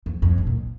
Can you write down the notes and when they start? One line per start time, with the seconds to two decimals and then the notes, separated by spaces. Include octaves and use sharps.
0.06 F2
0.22 F2
0.38 G2
0.47 A#2